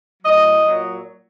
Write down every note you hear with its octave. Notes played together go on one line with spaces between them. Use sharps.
A2 F#3 D#5
A#2 F#3